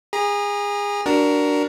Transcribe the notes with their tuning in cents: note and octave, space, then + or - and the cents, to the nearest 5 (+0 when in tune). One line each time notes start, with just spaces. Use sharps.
G#4 -25 A#5 +25
D4 +0 F#4 +20 A#4 +5